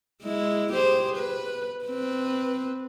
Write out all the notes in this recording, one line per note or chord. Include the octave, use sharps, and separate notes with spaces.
G#3 E4
G4 G#4 C5
B4
C4 B4